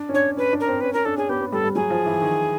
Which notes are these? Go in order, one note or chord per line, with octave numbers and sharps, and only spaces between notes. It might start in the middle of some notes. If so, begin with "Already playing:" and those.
Already playing: D4
C#4
D4 C#5
C#4 B4
D4
A#4
C4
C#4 B4
C#4 A#4
D4 A4
C#4 G#4
B3 G4
B3
G3 A4
G3
F#3 G#4
F3
E3
D#3